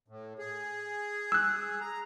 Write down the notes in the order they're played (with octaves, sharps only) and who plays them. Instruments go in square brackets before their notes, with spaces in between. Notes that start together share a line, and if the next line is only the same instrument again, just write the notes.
[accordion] A2
G#4
[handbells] E6 F#6
[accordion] A#5